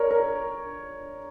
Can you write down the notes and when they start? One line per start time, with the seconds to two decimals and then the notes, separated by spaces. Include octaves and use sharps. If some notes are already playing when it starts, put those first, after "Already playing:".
Already playing: A#4 C#5 D5
0.11 A#4